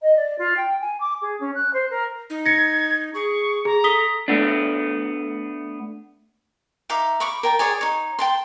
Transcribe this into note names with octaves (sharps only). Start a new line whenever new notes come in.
D#5
D5
F4
G5
G#5
D6
G#4
C#4
F#6
C5
A#4
D#4
G#6 A#6 C#7
G#4 C#6
G#4 A#5
A4 D#6 B6 G7
A3 B3 D4
D#4 E5 F5 D6
B5 C#6 D6
A#4 G5 A5
G#4 C#5 D5 G#5
D#4 C#5
G5 A5 C6